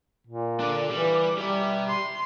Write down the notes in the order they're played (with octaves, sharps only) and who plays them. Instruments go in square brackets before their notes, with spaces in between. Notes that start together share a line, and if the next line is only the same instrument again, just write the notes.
[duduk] A#2
[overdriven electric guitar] D4 A4 [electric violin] D6
[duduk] E3 [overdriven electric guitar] G3
[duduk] G3 [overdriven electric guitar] G4 E5
[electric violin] C6